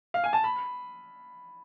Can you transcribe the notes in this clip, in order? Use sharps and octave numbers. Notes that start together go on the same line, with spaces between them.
F5
G#5
A5
B5